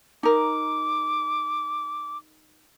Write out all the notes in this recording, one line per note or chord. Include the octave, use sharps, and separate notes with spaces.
D#4 A#4 D6